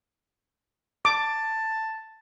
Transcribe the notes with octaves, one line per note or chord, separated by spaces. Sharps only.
A5 D6